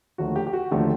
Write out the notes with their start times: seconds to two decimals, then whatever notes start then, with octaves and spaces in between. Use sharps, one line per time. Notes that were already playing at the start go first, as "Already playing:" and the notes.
0.18 D#2 D3 F3 A3 F#4
0.36 G4
0.47 G4
0.53 F#4
0.71 D#2 D3 F3 A3 G4